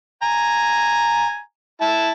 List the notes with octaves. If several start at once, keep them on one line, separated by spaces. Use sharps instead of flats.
G#5 A#5
E4 A5